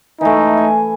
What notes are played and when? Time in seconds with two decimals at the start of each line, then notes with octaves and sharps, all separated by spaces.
0.21 E3 A3 D#4
0.58 G#5